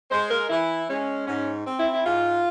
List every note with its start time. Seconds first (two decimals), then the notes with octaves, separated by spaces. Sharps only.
0.11 G#3 C5
0.30 A#4
0.49 E3 E4
0.89 G#3 C#4
1.27 G#2 C#4
1.67 C4
1.79 E4
1.93 E4
2.05 G#2 F4